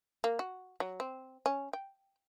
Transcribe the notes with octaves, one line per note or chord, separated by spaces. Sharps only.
A#3
F#4
F#3
C4
C#4
G5